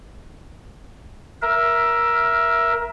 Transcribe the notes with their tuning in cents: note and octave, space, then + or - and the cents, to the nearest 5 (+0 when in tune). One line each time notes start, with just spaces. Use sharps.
A#4 +20 E5 +10